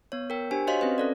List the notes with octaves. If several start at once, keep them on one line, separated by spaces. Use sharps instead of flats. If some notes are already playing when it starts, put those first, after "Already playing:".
B3 C#5
A#4 G5
D4 G4 C5 G#5
F#4 C5 C#5 D#5 F5 C6
C4 C#4 B4
C#4 A4 D5